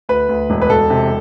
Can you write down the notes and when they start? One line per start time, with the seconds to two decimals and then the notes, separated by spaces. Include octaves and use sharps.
0.09 D2 B4
0.29 D2
0.50 E1
0.61 B4
0.70 E1 A4
0.90 C3